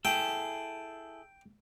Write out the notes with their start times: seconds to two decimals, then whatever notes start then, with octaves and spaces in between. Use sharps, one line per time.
0.05 E4 G#4 A4 G5